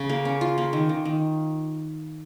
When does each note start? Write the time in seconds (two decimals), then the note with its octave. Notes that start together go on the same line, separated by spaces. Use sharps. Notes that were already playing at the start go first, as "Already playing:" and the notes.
Already playing: C#3
0.09 A#3
0.25 C#4
0.41 F4
0.58 A#3
0.73 D#3
0.89 D#3
1.05 D#3